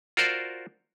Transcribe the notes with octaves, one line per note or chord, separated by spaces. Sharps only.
F4 F#4 A#4 C5 D5